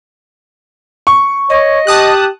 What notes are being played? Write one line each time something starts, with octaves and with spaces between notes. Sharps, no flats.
C#6
C#5 D#5
G4 A5 D#6 F#6